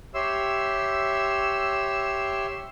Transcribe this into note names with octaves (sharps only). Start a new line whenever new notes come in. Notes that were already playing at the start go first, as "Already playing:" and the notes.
G4 C#5 E5 C6 E6